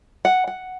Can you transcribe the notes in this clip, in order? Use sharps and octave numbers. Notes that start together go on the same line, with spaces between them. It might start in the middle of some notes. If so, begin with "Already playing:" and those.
F#5
F#5